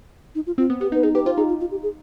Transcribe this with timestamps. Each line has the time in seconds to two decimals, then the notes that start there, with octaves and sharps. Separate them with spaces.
0.35 D#4
0.47 F4
0.58 C4 F4
0.70 B3
0.80 B3 G4
0.92 D#4
0.95 B4
1.03 D#4 G#4
1.15 G4 B4
1.25 F4 C5
1.37 D#4 G#4
1.49 F4
1.61 F4
1.71 G4
1.83 G#4